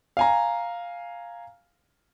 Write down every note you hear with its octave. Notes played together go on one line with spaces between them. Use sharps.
F5 G#5 A#5